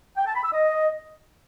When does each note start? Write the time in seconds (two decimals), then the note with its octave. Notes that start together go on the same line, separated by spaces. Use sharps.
0.16 G5
0.25 A5
0.34 B5
0.44 E6
0.53 D#5